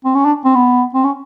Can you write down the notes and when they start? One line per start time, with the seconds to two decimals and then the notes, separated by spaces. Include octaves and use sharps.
0.05 C4
0.15 C#4
0.25 D4
0.45 C4
0.55 B3
0.94 C4
1.04 C#4